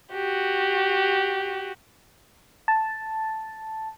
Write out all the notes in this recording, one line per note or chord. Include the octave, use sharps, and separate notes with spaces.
F#4 G4
A5